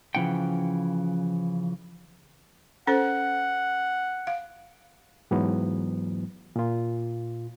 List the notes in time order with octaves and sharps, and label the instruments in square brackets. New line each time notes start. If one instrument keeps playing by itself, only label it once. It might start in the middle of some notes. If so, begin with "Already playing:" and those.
[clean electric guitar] C#3 E3 F3 D4 F#5 G5
[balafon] C#4 A4 C5 [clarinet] F#5
[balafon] F5
[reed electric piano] G#2 E3 F#3 B3
A#2 F4